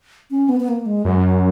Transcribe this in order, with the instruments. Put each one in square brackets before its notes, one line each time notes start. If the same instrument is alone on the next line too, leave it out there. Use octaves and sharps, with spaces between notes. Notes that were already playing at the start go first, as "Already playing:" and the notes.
[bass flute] C#4
B3
B3
A#3
G#3
[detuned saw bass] F#2 [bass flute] F#3